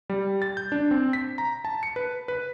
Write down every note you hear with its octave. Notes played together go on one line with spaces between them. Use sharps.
G3
A6
G6
D4
C4
B6
A#5
A5
C#7
B4
B4